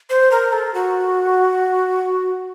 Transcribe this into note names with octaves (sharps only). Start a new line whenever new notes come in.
C5
A#4
A4
F#4